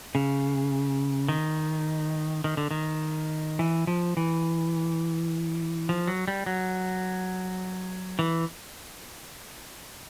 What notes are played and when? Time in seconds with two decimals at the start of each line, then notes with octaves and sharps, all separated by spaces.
0.15 C#3
1.28 D#3
2.44 D#3
2.57 D3
2.71 D#3
3.59 E3
3.87 F3
4.17 E3
5.89 F3
6.07 F#3
6.28 G3
6.46 F#3
8.19 E3